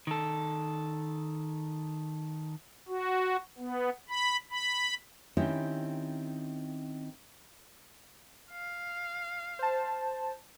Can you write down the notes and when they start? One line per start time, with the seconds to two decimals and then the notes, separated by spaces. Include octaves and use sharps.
0.07 D#3 A4
2.88 F#4
3.58 B3
4.10 B5
4.51 B5
5.37 D#3 C4 C#4 E4 G4
8.51 F5
9.59 C5 A5